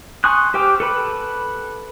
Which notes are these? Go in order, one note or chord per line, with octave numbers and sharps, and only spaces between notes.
G#5 C6 C#6 D#6 F#6
G4 C5 G5 D6 F6
A4 B4 B5